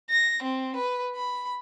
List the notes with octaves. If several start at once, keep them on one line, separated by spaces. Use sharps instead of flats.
A#6
C4
B4
B5